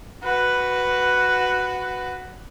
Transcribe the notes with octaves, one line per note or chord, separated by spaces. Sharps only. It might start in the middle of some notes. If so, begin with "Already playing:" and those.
F#4 B4